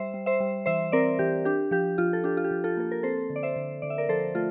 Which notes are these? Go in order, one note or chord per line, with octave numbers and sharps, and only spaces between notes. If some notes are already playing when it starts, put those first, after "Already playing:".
Already playing: G3 C5 E5
G3
C5 E5
G3
E3 C5 E5
C4 A#4 D5
E3 G4
D4 G4
F3 G4
F3 F4
A4
D4 G4
F4
G4
F3
F4 A4
A#3 A4
A#4
C4 A4 C5
D3
D5
C5 E5
D3
D3 D5
E5
A#4 D5
F3 A4 C5
A3 F4 A4